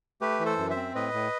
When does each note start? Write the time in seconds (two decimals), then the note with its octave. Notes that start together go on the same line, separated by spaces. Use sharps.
0.21 A3 G4 B4
0.40 E3
0.45 A4 C5
0.58 F#2
0.70 C5 E5
0.76 C4
0.95 A2 B4 D#5
1.14 A2